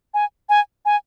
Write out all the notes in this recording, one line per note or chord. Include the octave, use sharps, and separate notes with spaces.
G#5
G#5
G#5